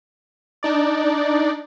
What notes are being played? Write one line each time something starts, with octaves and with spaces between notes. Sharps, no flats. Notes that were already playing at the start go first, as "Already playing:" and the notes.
D4 D#4 D5